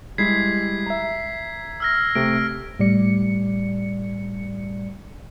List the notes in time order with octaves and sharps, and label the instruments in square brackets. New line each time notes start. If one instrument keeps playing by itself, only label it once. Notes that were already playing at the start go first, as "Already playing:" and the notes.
[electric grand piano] G3 G#3 E4 [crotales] G#6 B6 C7
[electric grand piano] E5 A#5
[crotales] E6 F6 A#6
[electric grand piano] C3 A3 [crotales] D7
[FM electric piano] A2 G3 D5 C#7